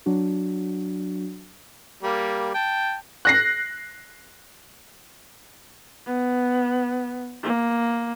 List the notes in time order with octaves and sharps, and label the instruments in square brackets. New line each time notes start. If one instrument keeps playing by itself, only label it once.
[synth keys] F#3 D4 F#4
[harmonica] G3 A#3
G5 A5
[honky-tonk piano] F#6 A#6 C7
[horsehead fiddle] B3
A#3